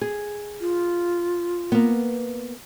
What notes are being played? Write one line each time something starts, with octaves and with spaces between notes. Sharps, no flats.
G#4
F4
A#3 B3